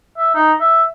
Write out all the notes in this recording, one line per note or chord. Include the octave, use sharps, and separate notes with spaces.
E5
D#4
E5